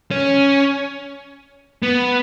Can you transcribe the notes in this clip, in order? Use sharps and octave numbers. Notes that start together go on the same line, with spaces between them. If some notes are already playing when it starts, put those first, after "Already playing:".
C#4
B3